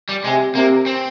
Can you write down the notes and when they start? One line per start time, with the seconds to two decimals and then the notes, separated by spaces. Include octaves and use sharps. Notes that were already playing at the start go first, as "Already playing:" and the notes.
0.09 G3
0.24 C3 G#3
0.55 C3 A#3
0.86 C4